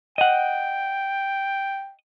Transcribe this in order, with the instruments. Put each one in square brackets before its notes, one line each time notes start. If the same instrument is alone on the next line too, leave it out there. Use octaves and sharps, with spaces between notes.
[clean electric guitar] D#5 F#5 [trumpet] G5